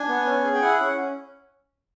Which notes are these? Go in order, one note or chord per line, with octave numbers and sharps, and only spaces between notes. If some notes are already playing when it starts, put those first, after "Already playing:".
Already playing: D4 G#5
B3
C#4
G#4
G5
E4 F#5
C#4